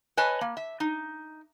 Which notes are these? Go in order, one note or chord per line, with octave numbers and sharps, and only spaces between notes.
B4 C#5 D#5 G#5 A5
A#3
E5
D#4